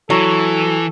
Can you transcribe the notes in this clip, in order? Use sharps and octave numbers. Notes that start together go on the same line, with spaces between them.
E3 F#3 A4